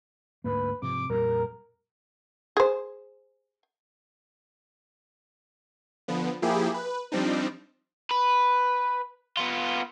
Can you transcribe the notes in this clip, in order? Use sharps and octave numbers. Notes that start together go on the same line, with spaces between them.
D2 G#2 A#3 B4
G#2 C3 F3 D6
F2 A#2 G3 A#4
G#4 C5
D3 F3 B3
F3 A#3 E4 G4 G#4
B4
F3 G3 C4 D4 D#4
B4
B3 F4